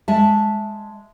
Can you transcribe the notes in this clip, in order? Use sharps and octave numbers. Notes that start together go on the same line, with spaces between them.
G#3 E5 A5